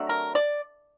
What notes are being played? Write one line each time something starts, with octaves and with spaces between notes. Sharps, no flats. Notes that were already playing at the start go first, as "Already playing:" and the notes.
Already playing: C3 F#3 A3 D4
A#4
D5